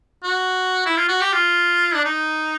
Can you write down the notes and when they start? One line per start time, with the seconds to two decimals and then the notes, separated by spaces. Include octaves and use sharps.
0.23 F#4
0.86 E4
0.96 F4
1.08 F#4
1.21 G4
1.33 F4
1.94 D4
2.05 D#4